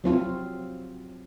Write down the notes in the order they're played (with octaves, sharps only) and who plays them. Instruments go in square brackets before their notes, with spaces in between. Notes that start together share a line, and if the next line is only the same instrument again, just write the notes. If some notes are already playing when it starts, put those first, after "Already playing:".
[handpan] F#3 C4 F4